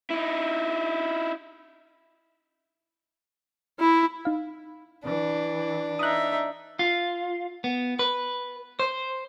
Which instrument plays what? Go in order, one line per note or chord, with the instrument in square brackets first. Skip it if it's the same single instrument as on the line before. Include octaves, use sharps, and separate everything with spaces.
[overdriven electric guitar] D#4 E4
[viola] E4
[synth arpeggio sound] D#4 F5
[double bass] E3 [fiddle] D4
[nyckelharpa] D#4 E5 [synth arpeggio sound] D#6 F#6
[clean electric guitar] F4
B3
B4
C5